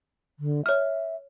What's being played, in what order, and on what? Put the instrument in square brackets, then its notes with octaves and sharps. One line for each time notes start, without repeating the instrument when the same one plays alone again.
[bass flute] D3
[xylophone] C#5 F6 [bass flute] E5